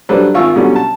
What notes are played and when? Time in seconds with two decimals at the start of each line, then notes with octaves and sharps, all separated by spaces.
0.09 F#3 G3 D4 A4 B4 C5
0.34 G#1 F4 C#6 E6
0.56 B2 D3 F#3 G3 C#4
0.76 A5